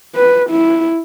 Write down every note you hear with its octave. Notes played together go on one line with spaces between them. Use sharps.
B4
E4